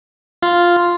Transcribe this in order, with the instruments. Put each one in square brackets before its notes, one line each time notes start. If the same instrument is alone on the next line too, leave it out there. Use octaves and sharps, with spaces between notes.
[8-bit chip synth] F4 [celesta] C6